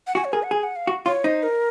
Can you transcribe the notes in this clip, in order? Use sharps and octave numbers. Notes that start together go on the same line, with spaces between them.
F#5
F#4 G#5
C#5
G#4 A#4
F#5
G#4 G#5
F#5
F5
F#4
F4 C#5
D#4 C5
A#4